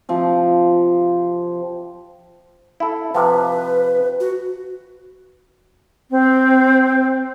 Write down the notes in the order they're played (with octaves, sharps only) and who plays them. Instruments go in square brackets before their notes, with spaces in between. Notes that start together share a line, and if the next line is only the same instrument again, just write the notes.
[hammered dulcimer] C3 F3
[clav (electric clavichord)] E4 A4
[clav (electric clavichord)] C3 F3 [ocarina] B4
[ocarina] F#4
[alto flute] C4